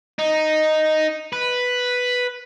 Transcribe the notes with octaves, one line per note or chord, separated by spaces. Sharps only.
D#4
B4